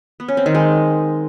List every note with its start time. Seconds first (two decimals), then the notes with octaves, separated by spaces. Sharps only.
0.20 B3
0.28 C#4
0.37 C4
0.46 D#3
0.55 G#3